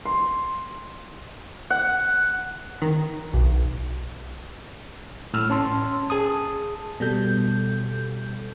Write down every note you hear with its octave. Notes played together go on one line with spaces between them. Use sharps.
C6
F#5
D#3
B1
A2 E6 F6
C#4 A5 C6
G#4 A5 D#6
B2 G3 A4 G6